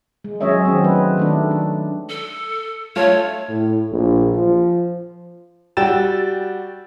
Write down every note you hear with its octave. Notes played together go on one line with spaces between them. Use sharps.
G#3
F#3 G#3 C#4 C#5 D#5 E5
D#3 F#3 G#3 C4
A3 B4
D#3 A3 D4
D4
A4
A3 F4 C#5
A2
A#1
F3
G3 F#4 G5 E6 A6 E7